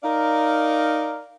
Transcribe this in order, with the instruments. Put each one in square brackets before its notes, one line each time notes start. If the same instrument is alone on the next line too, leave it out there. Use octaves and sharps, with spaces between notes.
[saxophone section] D#4 A#4 D5 F5